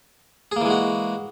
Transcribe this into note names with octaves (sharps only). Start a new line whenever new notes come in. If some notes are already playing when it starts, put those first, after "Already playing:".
E3 G#3 A#3 F#4 G#4